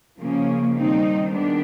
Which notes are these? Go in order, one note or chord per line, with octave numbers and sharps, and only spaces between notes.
C#3 F3 A#3 C#4
D#3 G3 C4 D#4
D#3 G#3 B3 D4